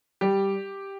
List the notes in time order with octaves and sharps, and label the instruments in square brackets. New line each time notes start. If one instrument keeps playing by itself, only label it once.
[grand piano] G3 G4